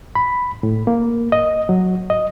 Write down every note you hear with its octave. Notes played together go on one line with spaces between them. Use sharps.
B5
A2
A#3
D#5
F#3
D#5